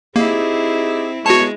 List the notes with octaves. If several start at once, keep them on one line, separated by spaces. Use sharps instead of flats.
A#3 C4 D#4 E4 G4 G#4
G#3 B3 F#4 C#5 A5